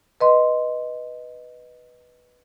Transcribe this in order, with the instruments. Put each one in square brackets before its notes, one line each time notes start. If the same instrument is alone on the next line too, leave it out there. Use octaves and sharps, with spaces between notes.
[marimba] B4 D#5 C6